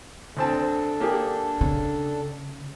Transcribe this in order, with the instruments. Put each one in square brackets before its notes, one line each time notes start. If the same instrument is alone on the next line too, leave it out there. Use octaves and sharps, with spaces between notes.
[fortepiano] D2 C4 A5 [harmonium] D4 A4
[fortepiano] A#3 G4 G#4
[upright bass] C#3